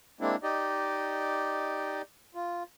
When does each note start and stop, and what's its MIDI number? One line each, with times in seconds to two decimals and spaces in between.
0.21 0.36 56
0.21 0.36 58
0.21 0.36 60
0.21 0.36 62
0.21 0.36 64
0.43 2.02 63
0.43 2.02 67
0.43 2.02 74
0.43 2.02 75
2.35 2.63 65